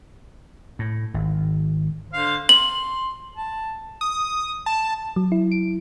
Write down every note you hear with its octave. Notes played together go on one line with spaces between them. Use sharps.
A2
G#1
D3 C5 F5
C6 F#7
A5
D#6
A5
F#3
E4
D7